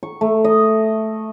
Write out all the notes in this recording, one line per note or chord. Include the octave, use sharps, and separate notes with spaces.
C#6
A3
D#5